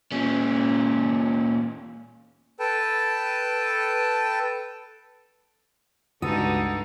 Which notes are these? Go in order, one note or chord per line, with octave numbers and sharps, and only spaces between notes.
A#2 C#4
A4 B4 G5 A5
C#2 G2 G#3 D#4 F#4 A4 B4 D#6